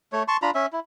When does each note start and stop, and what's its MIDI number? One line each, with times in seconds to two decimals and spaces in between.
0.13 0.23 57
0.13 0.23 73
0.28 0.37 81
0.28 0.37 84
0.28 0.37 85
0.42 0.51 62
0.42 0.51 65
0.42 0.51 82
0.42 0.51 83
0.55 0.66 61
0.55 0.66 76
0.73 0.80 64